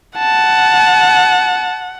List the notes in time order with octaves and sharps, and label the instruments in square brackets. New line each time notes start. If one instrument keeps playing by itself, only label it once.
[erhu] F#5 [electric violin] A5